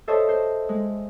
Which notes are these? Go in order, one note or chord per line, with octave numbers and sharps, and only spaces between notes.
A4 C5 C#5 D#5 E5
C5
G#3